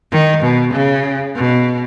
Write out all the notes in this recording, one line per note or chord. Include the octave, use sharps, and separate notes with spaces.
D#3
B2
C#3
B2